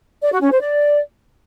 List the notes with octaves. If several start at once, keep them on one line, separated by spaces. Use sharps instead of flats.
D5
F#4
C#4
C5
D5